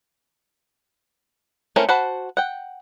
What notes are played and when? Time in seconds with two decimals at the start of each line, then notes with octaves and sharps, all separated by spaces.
1.76 A3 C4 C#4 E4 A#4
1.89 F#4 C5 F#5 A5 B5
2.37 F#5 G5